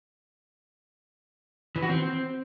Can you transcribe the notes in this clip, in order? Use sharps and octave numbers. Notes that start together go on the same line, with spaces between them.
E3
F#4
C4